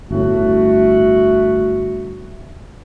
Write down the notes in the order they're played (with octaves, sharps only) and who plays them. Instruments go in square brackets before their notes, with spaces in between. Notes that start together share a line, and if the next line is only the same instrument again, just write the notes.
[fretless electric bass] G1 A2 [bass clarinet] A3 [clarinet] F#4